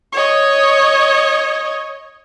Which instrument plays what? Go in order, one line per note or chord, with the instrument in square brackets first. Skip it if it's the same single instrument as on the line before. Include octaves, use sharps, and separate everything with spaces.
[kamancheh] C#5 D#5